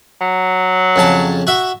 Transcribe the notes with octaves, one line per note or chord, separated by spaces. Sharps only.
F#3
F2 C#3 A5
F#4 E5